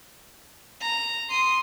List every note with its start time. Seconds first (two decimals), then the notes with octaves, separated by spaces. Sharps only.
0.81 A#5
1.30 C6 D#6